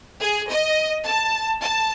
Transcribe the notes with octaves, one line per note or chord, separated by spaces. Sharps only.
G#4
D#5
A5
A5